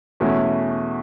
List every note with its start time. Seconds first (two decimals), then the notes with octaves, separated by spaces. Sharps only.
0.20 E2 B2 A3 C#4 E4